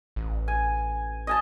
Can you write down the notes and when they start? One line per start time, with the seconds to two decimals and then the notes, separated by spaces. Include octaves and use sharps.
0.16 A1
0.48 G#5
1.27 D#5 G#5 A5